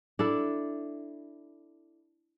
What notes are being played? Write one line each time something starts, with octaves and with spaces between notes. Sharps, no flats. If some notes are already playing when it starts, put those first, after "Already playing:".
D4 E4 A4